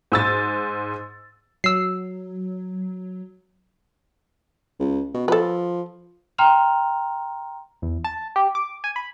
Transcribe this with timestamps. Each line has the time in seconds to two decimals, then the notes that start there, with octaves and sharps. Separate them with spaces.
0.12 G#2 E6 A6
1.64 F#3 E6 C7
4.79 C#2
5.14 B2
5.28 F3 A4 B4
6.38 G5 A#5 C6 F6 F7
7.82 E2
8.04 A5
8.36 G4
8.55 D6
8.84 G#5
8.96 B5